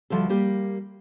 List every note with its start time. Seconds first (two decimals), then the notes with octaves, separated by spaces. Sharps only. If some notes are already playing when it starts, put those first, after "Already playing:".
0.10 D2 F3 G3 A4
0.29 G3 A#3 G4